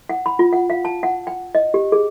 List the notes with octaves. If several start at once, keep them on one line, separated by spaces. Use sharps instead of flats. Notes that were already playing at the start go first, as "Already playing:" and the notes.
F#5
B5
F4
F#5
F5
A5
F#5
G5
D#5
G4
G#4